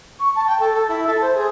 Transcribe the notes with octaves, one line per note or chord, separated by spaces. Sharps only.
C#6
A5
G5
A4
A4
E4
A4
C5
G#4